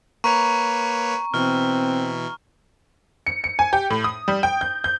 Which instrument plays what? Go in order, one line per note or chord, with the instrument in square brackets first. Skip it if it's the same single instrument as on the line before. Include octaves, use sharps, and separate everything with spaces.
[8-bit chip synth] A#3 B4 C#5 [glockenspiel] A#5 [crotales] C#6
[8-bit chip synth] B2 E3 [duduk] C4 [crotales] F6
[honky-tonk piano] C#7
C#7
G#5
G4
A2
D#6
G3
G5
G6
G6